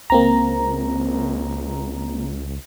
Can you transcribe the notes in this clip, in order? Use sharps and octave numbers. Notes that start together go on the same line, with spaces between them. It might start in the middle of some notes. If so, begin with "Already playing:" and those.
C#2 A#3 C4 A#5